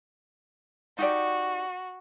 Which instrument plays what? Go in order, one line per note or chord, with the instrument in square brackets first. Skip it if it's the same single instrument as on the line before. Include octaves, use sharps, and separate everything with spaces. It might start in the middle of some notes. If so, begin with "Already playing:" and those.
[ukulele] D#4 G4 D5 [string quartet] F#4